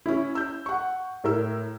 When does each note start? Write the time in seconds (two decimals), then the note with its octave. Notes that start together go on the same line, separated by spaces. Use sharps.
0.06 C#4 E4
0.35 E6 G6
0.66 F#5 C#6
1.24 A2 A#4 E6